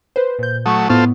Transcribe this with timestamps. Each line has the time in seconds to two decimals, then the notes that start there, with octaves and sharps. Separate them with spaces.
0.16 B4 C5
0.39 A#2 G6
0.66 F#3 A3 C#6 D#6
0.90 A2 B3 E4 F4 A4 C5